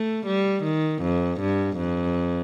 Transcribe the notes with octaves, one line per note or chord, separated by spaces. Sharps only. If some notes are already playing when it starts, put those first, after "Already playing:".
Already playing: A3
G3
D#3
F2
G2
F2